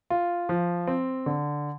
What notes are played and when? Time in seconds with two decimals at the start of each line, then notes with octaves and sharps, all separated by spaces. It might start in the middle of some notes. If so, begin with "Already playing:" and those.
0.10 F4
0.49 F3
0.87 C4
1.26 D3